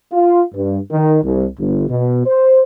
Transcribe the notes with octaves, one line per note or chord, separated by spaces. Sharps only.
F4
G2
D#3
C2
G1
B2
C5